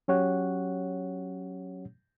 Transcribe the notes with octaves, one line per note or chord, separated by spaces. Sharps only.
F#3 C#4 G4 C#5 F#5